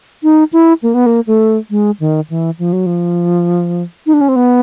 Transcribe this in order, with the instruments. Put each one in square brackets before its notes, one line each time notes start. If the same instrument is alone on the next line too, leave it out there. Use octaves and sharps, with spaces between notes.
[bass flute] D#4
E4
A#3
B3
A#3
A3
G#3
D#3
E3
F3
F#3
F3
D#4
D4
C#4
C4
B3